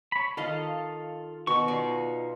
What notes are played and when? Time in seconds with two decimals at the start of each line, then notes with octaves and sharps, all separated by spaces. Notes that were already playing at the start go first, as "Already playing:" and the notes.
0.12 C#5 B5
0.37 D#3 F4 A4 D#5 F5
1.47 B2 D#3 C#6
1.68 D#4 F4 D5